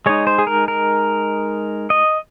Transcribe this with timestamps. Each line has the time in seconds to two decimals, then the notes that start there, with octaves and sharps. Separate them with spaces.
0.06 G#3 D#4 C#5
0.27 C5
0.38 G#4
0.47 A#4
0.68 A#4
1.90 D#5